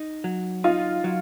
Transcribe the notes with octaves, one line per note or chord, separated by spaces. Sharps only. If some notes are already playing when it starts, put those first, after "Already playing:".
Already playing: D#4
F#3
D#4 F4
F#3